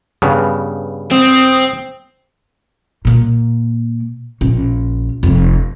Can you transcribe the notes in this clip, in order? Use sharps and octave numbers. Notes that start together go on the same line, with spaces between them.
G2 C#3 B3
C4 D#6
A#2 A#3
A#1 C#4
F1 F2